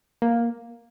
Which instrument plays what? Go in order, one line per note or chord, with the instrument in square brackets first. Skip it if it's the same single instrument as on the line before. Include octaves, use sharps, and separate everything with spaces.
[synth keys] A#3